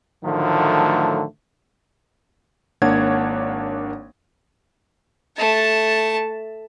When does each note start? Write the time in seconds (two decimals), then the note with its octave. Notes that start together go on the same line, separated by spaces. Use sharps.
0.24 A2 D3 D#3 F3 F#3 A3
2.82 G#1 A#3 D4 C#5 F#5 G#6
5.37 A3 A5